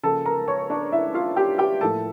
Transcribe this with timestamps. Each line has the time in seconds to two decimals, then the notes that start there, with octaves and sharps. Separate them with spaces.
0.03 C#3 F3 A#3 A4 A5
0.25 A#4 A#5
0.48 C#5 C#6
0.70 D4 D5
0.92 E4 E5
1.14 F4 F5
1.36 G4 G5
1.58 G4 G5
1.81 A2 F3 A#3 A4 A5